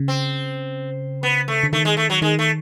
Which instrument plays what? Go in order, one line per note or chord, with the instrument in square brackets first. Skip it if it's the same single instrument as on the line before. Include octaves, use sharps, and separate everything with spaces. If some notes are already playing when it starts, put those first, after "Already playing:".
Already playing: [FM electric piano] C#3
[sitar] C4
B3
A3
[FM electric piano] D3
[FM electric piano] D#3 [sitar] A3
[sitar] G#3
A3
F#3
[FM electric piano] D#3 [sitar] G#3
[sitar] A3